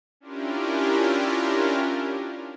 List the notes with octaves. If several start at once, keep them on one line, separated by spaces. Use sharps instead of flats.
C#4 D4 E4 F4 G4 A#4